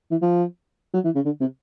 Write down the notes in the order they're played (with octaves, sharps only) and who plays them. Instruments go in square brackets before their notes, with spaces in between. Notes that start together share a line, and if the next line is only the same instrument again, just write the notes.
[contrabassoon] E3
F3
F#3
E3
C#3
D3
C3